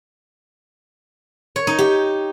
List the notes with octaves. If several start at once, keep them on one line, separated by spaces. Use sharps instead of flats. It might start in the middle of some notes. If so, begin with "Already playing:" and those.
C#5
D#4
G4